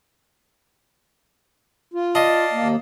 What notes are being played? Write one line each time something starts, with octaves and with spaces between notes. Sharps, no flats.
F4
D5 D#5 F5 A5
D#2 A#3